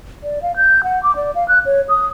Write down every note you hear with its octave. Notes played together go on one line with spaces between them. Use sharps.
D5
F5
G6
F#5
D6
D5
F5
F#6
C#5
D#6